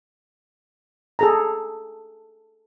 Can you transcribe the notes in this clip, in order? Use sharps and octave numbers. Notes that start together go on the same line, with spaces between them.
G#4 A4 A#5